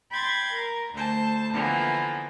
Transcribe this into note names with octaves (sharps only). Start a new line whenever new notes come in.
G5 B5 C6 G#6 A6
A#4
D2 C5 A5
D3 E3 F3 A#3 B3